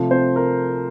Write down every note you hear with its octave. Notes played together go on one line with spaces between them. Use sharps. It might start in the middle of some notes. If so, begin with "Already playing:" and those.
Already playing: C3 F3 A3
C4 C5
A#4